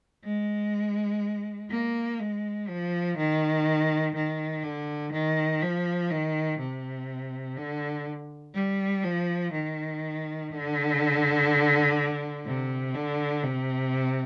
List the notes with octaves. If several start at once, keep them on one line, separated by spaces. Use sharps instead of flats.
G#3
A#3
G#3
F3
D#3
D#3
D3
D#3
F3
D#3
C3
D3
G3
F3
D#3
D3
C3
D3
C3